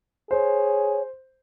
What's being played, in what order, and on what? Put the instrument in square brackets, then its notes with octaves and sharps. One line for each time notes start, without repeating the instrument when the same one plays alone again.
[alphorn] G#4 [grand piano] C5 [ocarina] C#5